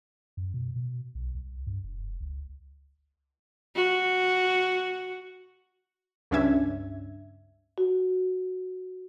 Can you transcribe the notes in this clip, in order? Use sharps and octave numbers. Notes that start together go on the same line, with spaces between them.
F#2
B2
B2
B1
C2
G2
F1
C#2
F#4
C#2 G2 C#4 D4 E5 G#6
F#4